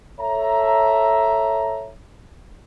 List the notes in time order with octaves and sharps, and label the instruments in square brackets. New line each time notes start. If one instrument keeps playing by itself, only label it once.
[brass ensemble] A4 C#5 E5 A#5